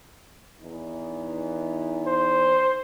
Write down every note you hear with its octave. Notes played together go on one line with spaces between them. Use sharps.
E2 E3 D#4
C5